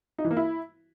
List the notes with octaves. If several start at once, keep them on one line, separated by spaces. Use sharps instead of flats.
D#4
E3
A#3
E4